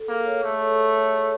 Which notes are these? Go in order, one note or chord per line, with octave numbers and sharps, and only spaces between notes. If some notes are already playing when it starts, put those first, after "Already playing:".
Already playing: A4
A#3 G#4
C#5
A3 G#4
C#5
C#5
C#5
G#4